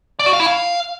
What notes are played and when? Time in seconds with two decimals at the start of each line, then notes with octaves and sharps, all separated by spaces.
0.19 D5
0.26 F#4
0.33 F5
0.40 E4
0.46 F5